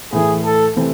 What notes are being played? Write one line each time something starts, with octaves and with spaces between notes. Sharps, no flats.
A2 E3 A3 G#4
A4
C3 E3 A3 C4